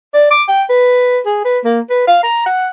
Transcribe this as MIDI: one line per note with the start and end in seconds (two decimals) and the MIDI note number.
0.13 0.28 74
0.31 0.43 86
0.49 0.63 79
0.70 1.20 71
1.26 1.40 68
1.45 1.59 71
1.65 1.80 58
1.90 2.05 71
2.08 2.18 77
2.23 2.43 82
2.46 2.69 78